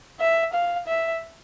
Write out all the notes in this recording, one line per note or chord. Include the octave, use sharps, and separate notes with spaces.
E5
F5
E5